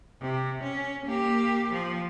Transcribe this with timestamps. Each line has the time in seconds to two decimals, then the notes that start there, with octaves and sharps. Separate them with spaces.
0.22 C3
0.63 C#4
1.05 A#3 G4
1.72 F3